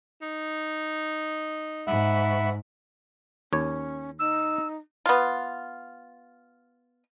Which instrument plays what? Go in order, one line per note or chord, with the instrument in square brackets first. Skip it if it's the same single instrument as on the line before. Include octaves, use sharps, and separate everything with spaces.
[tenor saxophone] D#4
[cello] G#2 [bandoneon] E5 F#5 B5
[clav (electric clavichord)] D#2 C#5 [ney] C#4
[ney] D#4 [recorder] E6
[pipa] B3 F4